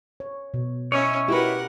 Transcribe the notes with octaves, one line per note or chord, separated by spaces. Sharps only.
C#5
B2
C#4 E4 C#5 D#5 E5
E4 F#4 G4 A#4 B4 F#5